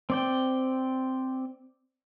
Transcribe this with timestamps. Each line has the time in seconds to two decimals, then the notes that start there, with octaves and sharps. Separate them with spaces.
0.10 C4 D5 G5